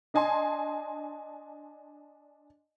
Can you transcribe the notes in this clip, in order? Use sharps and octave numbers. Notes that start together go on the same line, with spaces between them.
D4 D#5 G#5 A5 C6